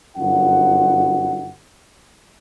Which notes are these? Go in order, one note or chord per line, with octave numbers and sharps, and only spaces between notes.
G1 F#2 F#3 D#4 F4 F#5